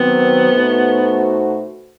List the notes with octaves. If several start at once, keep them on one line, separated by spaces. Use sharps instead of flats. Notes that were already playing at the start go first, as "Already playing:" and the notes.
Already playing: D#3 F#3 B3 C4
B2 A3 D#4 F#4 C5